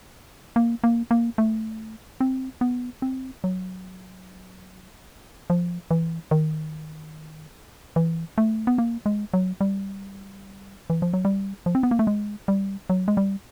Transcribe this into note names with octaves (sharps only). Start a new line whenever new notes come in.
A#3
A#3
A#3
A3
C4
B3
C4
F#3
F3
E3
D#3
E3
A3
B3
A#3
G#3
F#3
G3
E3
F3
F#3
G3
F3
C4
B3
A#3
A3
G#3
G3
F#3
G#3
G3